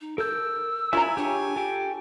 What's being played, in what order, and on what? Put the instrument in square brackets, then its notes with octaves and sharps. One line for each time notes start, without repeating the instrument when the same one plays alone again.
[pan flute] D#4
[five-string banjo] A4 [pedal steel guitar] A#4 G6 [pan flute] E6
[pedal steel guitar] E4 E5 [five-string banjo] F4 A#5 [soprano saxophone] G#5
[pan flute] D4 [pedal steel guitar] G4 G#4 C#5
[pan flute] G4 [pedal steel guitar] A4 G5